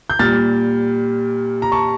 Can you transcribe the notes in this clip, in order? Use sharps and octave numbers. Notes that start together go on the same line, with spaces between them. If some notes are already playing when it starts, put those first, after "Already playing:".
G6
A#2 G3 F6 A6
A#5
A5 C#6